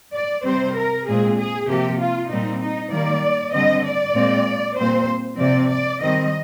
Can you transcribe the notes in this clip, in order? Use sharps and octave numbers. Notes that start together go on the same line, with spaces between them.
D5
C3 G3 C4 C5
A#4
A#2 G#3 C4 G#4
G#4
C3 F3 A#3 G4
F4
A#2 G3 C4 D#4
D#4
D#3 G3 A#3 D5
D3 G3 C4 D#5
D5
A#2 G#3 C4
A#2 G3 C4 C5
C3 F3 C4 D5
D5
D#3 G3 C4 D#5